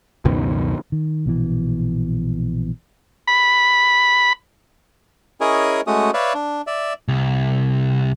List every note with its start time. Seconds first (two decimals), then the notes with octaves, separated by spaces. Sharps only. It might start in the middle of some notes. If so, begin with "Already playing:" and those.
0.25 C#2 F#2 B2 D#3
0.92 D#3
1.26 A#1 B2 E3
3.27 B5
5.41 C#4 E4 G#4 A#4 C#5 D#5
5.87 G#3 A3 C#4 F#4 D#6
6.14 B4 C#5 D5 E5 F5
6.34 D4
6.67 D5 E5
7.08 C2